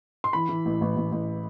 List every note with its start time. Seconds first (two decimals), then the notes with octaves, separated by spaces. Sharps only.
0.24 C6
0.33 E3 B5
0.49 E3
0.65 A1
0.81 A1
0.97 A1
1.12 A1